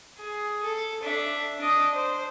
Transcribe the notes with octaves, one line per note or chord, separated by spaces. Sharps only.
G#4
A4
D4 E5
D4 D#5
C5